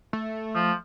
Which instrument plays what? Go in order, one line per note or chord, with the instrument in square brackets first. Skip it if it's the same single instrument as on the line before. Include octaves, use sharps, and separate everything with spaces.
[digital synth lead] A3
[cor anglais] F3